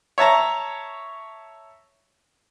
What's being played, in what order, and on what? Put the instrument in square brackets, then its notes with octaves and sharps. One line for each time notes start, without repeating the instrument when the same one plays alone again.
[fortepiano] C#5 E5 A5 A#5